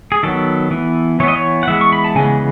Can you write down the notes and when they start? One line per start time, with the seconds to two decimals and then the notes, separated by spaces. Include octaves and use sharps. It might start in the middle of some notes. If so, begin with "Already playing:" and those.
0.12 G#4
0.23 D#3 F#3 B3 A4
0.71 E3 B3
1.20 E3 C#5
1.23 B3 D#5
1.36 C#5
1.63 F#5
1.68 E3 G#3 B3 E5
1.81 C#6
1.93 B5
2.04 A5
2.15 C#3 E3 G#3 B3 G#5